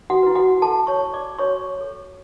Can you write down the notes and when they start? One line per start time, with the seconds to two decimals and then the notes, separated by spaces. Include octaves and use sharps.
0.10 F#4 F#5
0.23 E4 B4
0.35 F#4 F#5
0.62 F#4 A4 A5
0.87 C#5 C#6
1.00 A4 C#5
1.14 D5 D6
1.39 F#4 C#5 C#6
1.77 A4 C#5